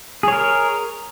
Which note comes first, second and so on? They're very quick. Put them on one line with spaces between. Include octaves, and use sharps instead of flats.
G#4 C#5 A#4